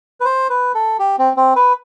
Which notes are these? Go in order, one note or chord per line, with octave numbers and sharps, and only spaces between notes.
B4
C5
B4
A4
G4
C4
C4
B4